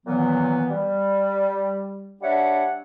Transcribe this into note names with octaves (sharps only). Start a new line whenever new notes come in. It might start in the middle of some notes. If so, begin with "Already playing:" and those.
A#2 D#3 E3 F#3 B3
G3
G3 D4 C#5 E5 F#5